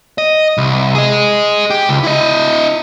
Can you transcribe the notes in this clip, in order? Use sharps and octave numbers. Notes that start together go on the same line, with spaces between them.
D#5
C2
G#4 D#5
G4
C#2
E4 D#5